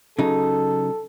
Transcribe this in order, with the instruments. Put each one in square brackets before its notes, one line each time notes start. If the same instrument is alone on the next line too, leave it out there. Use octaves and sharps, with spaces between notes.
[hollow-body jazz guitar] C#3 F#3 D#4 [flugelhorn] A4